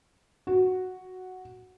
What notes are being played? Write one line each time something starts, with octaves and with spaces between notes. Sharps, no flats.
F#4